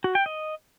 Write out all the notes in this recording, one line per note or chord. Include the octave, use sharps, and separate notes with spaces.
F#4
G5
D#5